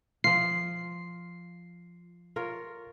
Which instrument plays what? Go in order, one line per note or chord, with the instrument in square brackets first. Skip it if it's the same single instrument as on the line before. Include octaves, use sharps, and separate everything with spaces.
[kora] F3 F4 [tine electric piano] C7
[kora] F4 A#4 C#5